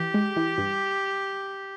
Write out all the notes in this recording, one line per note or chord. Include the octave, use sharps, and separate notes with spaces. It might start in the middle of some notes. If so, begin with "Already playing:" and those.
Already playing: E3 G4
G#3
E3
G2